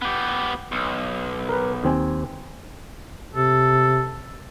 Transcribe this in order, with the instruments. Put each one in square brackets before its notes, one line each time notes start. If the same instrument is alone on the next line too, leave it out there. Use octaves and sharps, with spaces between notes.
[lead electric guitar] B3 G4
B1
[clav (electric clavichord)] A#4 B4
D#2 C4 G#5
[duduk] C3 [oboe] A4